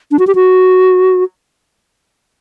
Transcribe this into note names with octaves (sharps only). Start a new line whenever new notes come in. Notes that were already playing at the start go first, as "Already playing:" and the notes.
D4
F#4
G4
F#4